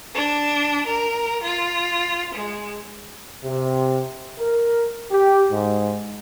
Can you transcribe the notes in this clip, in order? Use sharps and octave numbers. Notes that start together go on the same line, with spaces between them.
D4
A#4
F4
G#3
C3
A#4
G4
G#2